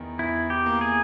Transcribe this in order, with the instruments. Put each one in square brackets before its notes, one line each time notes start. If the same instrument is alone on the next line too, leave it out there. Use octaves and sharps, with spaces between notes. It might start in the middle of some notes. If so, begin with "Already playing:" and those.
Already playing: [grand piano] E2 D#3
[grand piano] E2 [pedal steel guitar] E4
[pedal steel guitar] G4
[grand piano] A#3
[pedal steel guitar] G#4